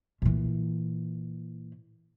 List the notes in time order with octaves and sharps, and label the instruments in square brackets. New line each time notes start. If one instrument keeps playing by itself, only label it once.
[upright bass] A#2 E3